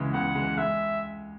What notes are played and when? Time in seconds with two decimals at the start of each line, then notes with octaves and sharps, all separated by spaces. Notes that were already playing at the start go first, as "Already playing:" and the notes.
Already playing: C#2 C#3 E3 G#3
0.14 C#2 F#5
0.35 C#3 E3 G#3
0.57 G#3 E5